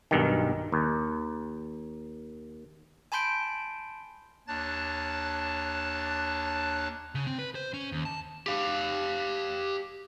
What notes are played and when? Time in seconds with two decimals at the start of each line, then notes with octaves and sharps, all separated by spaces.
0.11 B1 G2 D#3
0.72 D#2
3.12 G#5 A5 B5 C6 G6 D7
4.48 D#2 D4 C#5 A5 F#6 A6
7.15 C#3
7.27 C4
7.39 B4
7.55 C5
7.74 C#4
7.92 D#2
8.05 A5
8.47 G4 F5